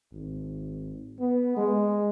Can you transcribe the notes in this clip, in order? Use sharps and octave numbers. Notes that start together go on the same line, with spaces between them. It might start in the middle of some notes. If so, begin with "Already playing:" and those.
G#1
B3
G#3